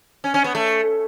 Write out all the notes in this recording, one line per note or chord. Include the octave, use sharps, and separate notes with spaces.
C#4
C#4
B3
A3